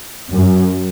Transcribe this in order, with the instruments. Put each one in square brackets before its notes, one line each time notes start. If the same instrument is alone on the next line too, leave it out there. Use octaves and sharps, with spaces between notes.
[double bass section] F#2